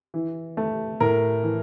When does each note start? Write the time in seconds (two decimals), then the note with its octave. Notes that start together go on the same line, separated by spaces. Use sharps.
0.14 E3
0.57 A3
1.00 A2 A#4
1.43 E3